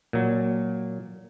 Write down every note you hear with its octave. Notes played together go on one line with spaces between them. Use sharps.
A#2 F#3